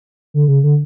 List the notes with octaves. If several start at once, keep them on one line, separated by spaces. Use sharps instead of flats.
D3
C#3
D3